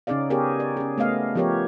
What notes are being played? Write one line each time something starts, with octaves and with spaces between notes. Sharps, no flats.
C#3 C#4 D#4 G#4 D5 F5
B3 G4 G#4 A#4 C#5
D5
C#4 G#4
A3 B3 D#5 F5
F3 B3 G4 A#4 C#5